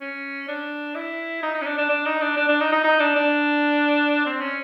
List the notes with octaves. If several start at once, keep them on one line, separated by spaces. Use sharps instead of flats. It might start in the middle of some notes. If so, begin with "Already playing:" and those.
C#4
D4
E4
D#4
D#4
C#4
D4
D4
D4
D#4
D4
D4
D4
D#4
D#4
D#4
D4
D4
C4
C#4